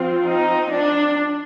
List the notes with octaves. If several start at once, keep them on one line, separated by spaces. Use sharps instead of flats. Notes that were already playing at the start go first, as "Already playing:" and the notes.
Already playing: F3 C4 F4
D#4
D4